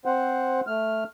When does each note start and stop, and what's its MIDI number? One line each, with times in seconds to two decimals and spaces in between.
0.05 0.61 60
0.05 0.61 72
0.05 0.61 78
0.67 1.04 57
0.67 1.04 89